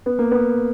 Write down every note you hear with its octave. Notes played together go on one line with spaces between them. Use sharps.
B3
A#3
B3